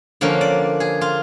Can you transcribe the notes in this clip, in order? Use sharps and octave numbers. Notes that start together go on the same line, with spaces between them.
D3 F3 A#3 C#4
D5
G#4
F4